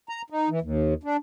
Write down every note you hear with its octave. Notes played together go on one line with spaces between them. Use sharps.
A#5
D#4
E3
D#2
D4